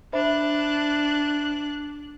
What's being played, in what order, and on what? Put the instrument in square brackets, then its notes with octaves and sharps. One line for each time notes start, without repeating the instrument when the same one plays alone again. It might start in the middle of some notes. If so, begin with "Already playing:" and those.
[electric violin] D4 F#6 [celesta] C5 E5 B5